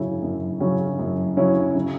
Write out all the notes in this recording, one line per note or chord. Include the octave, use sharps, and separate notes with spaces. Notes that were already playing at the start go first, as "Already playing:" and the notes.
Already playing: F#2 C#3 F#3 C#4 E4
F#2
C#3 F#3 C#4 E4
F#2
C#3 F#3 C#4 E4
C#3